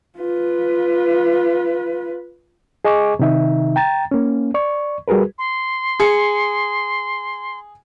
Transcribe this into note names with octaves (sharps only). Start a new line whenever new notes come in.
F4 B4
G#4 D#5 G#5 C#6 D6
C3 D#3 D#4 E5
G5 A#5 A6
A#3 C#4
D5 C#6
G3 F#4 G#4 A#4 B4
C6
G#4 C#7